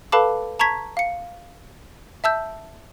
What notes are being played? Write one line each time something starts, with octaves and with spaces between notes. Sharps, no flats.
A4 B4 F5 A5 B5 D6
A5 A#5 C#6 G#6 B6
F5 C#7
E5 A5 E6 G6